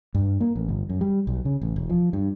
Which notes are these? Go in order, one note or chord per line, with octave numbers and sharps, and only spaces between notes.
G2
A#3
A1
G1
F#2
G3
B1
C#3
A1
E1
F3
G2